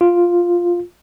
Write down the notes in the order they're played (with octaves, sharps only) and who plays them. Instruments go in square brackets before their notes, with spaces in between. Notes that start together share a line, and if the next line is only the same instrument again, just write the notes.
[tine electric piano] F4